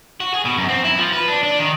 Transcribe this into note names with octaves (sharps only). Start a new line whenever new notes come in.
F#4
G#4
B2
F#2
C4
E4
F3
B4
D4
D4
D#3